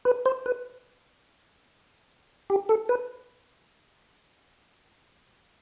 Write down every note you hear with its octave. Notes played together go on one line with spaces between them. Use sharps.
B4
C5
B4
G4
A4
B4